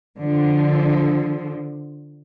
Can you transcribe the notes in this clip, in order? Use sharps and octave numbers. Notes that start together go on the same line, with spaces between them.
D3 F3